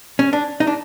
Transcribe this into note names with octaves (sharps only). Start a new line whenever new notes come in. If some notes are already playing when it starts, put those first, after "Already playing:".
C#4
D4
D#4
D4